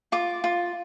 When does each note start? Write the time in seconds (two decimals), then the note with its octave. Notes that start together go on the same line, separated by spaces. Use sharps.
0.12 F4 D6
0.44 F4